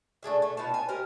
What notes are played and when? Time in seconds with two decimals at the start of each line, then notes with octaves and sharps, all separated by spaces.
0.23 A3 D4 G#4 E5
0.42 A3
0.57 B3 D#4 F4 A5
0.74 G#5
0.89 G4 A#4 C5